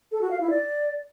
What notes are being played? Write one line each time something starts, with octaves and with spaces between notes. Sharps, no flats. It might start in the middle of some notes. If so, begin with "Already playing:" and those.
A4
F#4
F5
E4
D5